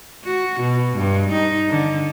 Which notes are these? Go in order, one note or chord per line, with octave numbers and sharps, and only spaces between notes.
F#4
B2
G2
D#4
D3